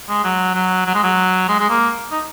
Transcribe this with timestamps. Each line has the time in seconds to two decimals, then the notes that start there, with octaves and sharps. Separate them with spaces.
0.09 G#3
0.24 F#3
0.54 F#3
0.86 F#3
0.94 G#3
1.03 F#3
1.49 G#3
1.59 G#3
1.70 A#3
2.11 D#4